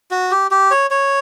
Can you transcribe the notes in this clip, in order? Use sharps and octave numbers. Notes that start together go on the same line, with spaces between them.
F#4
G4
G4
C#5
C#5